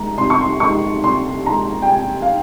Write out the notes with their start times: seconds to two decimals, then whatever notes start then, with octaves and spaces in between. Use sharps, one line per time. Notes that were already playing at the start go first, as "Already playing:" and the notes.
Already playing: D#3 G#3 D#4 A#5
0.18 C3 C6
0.30 C#6
0.41 C6
0.60 D#3 G#3 D#4 C#6
1.03 C3 C6
1.46 D#3 G#3 D#4 A#5
1.82 G5
1.89 C3 G#5
2.22 F5